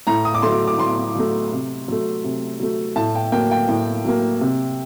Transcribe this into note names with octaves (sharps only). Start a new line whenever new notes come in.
A2 A#5
D#6
D6
F#3 A3 C6
D6
A2 C6
F#3 A3
C3
F#3 A3
C3
F#3 A3
A2 A5
G5
F#3 A#3 G5
G5
A2
F#3 A#3
C3